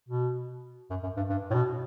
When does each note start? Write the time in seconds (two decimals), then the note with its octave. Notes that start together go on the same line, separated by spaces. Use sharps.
0.09 B2
0.90 F#2
1.03 F#2
1.16 G2
1.29 G2
1.50 A2
1.54 B2